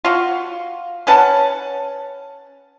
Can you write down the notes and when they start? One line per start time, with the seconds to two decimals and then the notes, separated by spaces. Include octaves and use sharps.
0.05 F4 F#4
1.07 C#4 B4 F#5 A5